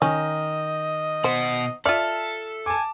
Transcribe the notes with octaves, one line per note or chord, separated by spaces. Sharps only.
D#3 C#4 D#5
B2 C5 F#5
F4 A4 D5 E5 F6
G#5 A5 D6